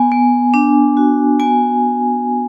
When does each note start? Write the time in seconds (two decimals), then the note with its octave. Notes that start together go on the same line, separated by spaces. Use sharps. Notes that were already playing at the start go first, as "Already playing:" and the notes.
Already playing: B3 G#5
0.12 B3
0.54 D4
0.97 F#4
1.40 B3 G#5